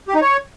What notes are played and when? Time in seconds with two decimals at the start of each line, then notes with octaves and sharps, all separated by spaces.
0.08 G4
0.15 D#4
0.22 C#5